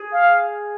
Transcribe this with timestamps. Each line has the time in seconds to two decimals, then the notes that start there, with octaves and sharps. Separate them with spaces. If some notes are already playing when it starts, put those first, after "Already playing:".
Already playing: G#4
0.12 F5